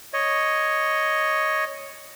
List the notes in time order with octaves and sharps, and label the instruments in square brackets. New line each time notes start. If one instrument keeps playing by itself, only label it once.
[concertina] C#5 D#5